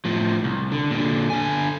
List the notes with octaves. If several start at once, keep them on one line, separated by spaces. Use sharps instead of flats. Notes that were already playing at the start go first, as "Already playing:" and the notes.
A2 F3
C2
D3
A#2 D3
D3 G#5